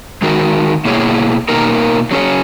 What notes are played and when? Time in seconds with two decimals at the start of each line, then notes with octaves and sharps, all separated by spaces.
0.22 D#3 G#3 D#4 F#4 A#4
0.85 B2 A#3 E4 G#4 C#5
1.49 B2 A#3 D#4 A#4
2.11 F#3 C#4 G#4 C#5